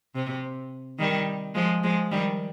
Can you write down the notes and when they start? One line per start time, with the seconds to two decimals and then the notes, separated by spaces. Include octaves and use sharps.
0.15 C3
0.99 D#3 G3
1.55 F3 G#3
1.83 F3 G#3
2.11 D#3 G3